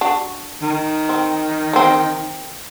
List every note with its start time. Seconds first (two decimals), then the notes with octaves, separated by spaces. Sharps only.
0.01 D4 F#4
0.62 D#3
1.09 C4
1.73 A#3 C4